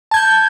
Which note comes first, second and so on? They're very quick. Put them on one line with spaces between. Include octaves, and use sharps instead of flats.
A5 G#6 G6